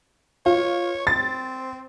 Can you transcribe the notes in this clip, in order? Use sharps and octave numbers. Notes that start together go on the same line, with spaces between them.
F4 C#5
C4 A6